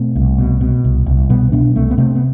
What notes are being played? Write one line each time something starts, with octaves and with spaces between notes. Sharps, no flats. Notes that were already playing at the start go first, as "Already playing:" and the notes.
Already playing: B2 A3 C4
C2
B2
B2
C2
C2
B2 G3 B3
B2 B3 D4
C2 A3 C4
B3
C3 A3 C4
B3